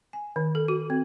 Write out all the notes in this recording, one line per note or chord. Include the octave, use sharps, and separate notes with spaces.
G#5
D#3
A4
F#4
C4